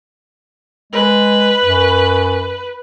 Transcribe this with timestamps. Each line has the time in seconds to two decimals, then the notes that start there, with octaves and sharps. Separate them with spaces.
0.93 G#3 B4
1.64 F#2